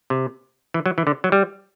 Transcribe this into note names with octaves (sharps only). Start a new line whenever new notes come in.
C3
E3
F#3
E3
D3
F#3
G3